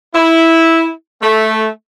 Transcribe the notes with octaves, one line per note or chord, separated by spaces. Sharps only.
E4
A3